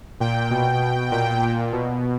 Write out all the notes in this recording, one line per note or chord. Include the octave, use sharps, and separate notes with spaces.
A#2 G5
B2
B2
A#2 G5
A#2
B2